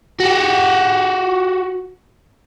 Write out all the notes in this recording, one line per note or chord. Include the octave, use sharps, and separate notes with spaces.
F#4 G4